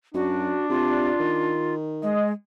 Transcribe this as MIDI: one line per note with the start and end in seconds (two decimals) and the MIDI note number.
0.14 0.56 42
0.14 1.54 62
0.14 0.68 66
0.70 1.11 48
0.70 1.74 65
1.20 2.16 51
2.03 2.32 56
2.03 2.28 75